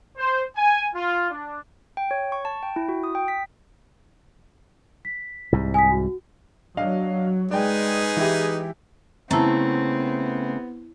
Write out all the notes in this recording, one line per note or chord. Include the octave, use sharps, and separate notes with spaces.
C5
G#5
F4
D4
G5
C#5
C#6
A5
G5
E4
F#4
D#6
G5
B6
B6
C2 G#2
G#5 D#6 B6
F#4
F#3 D4 D#5 F5
G#3 D#4 G#4 B4 D5 G5
E3 E4 G4
C#3 A3 B3 C4 E4 A5 A#5